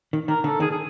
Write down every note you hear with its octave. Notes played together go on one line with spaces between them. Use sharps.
D#3
D#3 A#4
D3 A4
D#3 G#4
G#4